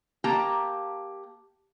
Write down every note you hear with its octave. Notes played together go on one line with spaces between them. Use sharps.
A#3 G4 A5 A#5